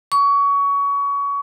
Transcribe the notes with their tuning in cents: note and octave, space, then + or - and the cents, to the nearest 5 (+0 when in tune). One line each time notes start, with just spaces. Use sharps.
C#6 +25